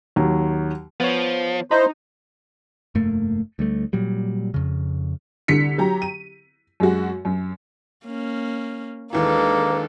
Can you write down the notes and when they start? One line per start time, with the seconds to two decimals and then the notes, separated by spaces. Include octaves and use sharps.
0.16 D#2 F#3
1.00 F3 B3 C#5
1.71 D#4 E4 C5 A#5 B5
2.95 F1 G2 A3 A#3
3.59 D2 G3 A3
3.93 A#2 F#3 G3
4.54 F2 C#3
5.48 C2 D3 B6 C#7
5.78 F#3 G4 A#5
6.02 D#7
6.80 F#2 G#3 F#4
7.25 F#2
8.05 A#3 C#4
9.13 D#2 E3 G#3 A#3 D4 A4 B4